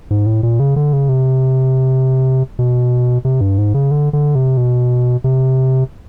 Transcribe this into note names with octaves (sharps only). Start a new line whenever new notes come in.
G#2
A2
A#2
C#3
D3
C#3
C3
B2
C3
G2
G#2
C#3
D3
D3
C3
B2
C3